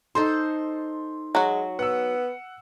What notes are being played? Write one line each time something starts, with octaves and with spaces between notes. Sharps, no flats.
D#4 A4 C5 C6
F#3 G#3 F#4
B3 F#5 E6